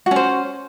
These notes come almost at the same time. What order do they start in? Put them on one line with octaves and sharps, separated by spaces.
F#4 C#4 C5